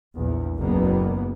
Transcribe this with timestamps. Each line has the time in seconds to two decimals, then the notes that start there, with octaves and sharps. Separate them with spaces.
0.16 A#1 E2
0.57 F#1 C#2 A#3 B3